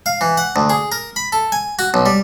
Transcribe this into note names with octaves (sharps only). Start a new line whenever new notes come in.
F5
E3
F#5
D2
G#4
A#4
B5
A4
G#5
F#4
B1
G3